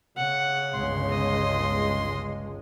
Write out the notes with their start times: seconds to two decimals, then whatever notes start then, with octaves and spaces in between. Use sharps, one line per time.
0.17 C#3 F#5
0.74 G1 C#2 G#3 C6
1.10 D#5